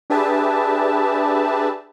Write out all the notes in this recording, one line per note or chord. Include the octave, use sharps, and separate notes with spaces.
D4 G4 G#4 B4 E5 A5